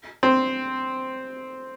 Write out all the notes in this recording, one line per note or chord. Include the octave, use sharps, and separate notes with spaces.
C4